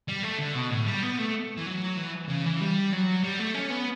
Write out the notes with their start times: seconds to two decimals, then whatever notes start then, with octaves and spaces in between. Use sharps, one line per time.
0.09 G3
0.24 A3
0.39 D3
0.56 B2
0.71 A2
0.87 G3
1.03 B3
1.19 A3
1.57 E3
1.66 F#3
1.97 E3
2.29 C#3
2.45 E3
2.61 G3
2.93 F#3
3.24 G3
3.40 A3
3.55 C#4
3.70 B3